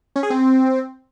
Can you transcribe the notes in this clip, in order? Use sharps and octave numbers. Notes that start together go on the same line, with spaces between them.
C#4
G#4
C4